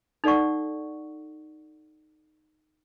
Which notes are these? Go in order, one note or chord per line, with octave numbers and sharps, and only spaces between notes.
D#4 A4 D5 F#5 C#6